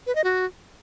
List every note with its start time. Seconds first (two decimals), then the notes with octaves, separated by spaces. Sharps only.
0.07 B4
0.15 D#5
0.24 F#4